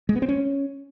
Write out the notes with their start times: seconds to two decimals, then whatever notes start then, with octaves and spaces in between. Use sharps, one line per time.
0.09 G#3
0.15 B3
0.22 C4
0.29 C#4